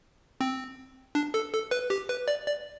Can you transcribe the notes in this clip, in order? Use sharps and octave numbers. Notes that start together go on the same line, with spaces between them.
C4
D4
A4
A4
B4
G4
B4
D5
D5